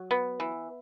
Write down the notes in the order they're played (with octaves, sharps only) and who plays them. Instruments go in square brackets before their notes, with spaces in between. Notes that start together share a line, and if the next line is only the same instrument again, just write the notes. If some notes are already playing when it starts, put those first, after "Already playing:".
Already playing: [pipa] F#3
B3
E3